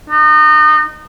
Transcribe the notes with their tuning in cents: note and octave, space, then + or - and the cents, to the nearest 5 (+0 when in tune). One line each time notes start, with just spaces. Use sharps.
D#4 -30